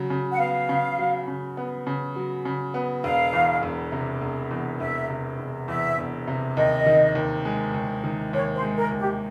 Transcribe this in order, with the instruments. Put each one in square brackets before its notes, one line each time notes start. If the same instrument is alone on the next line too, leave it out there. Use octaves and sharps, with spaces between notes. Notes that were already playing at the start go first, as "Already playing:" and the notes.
Already playing: [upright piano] C#3 F#3
C#3
[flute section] F#5
[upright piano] B3 [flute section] F5
[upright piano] C#3
F#3
C#3
B3
C#3
F#3
C#3
B3
[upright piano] E1 [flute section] F5
[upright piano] E2
E1
C3
E1
E2
[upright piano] E1 [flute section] E5
[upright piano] C3
E1
[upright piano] E2 [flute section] E5
[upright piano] E1
C3
[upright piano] D#2 [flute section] D#5
[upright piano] D#3
D#2
G#3
D#2
D#3
[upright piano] D#2 [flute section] C#5
[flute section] C5
[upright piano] G#3
[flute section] A#4
[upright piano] D#2
[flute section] G4